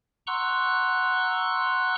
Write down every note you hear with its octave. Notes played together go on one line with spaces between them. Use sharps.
F#5 A#5 C6 C#6 E6 F#6